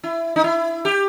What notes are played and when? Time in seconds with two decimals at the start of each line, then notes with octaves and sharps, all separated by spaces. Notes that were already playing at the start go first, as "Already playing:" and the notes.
0.03 E4
0.36 D#4
0.44 E4
0.85 G4